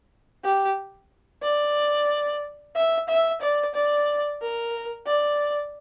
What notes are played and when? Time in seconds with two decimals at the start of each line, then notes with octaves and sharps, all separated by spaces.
0.44 G4
1.43 D5
2.75 E5
3.09 E5
3.41 D5
3.74 D5
4.41 A#4
5.07 D5